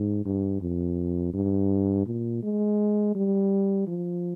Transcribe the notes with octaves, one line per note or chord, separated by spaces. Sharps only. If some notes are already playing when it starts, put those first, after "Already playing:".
Already playing: G#2
G2
F2
G2
A#2
G#3
G3
F3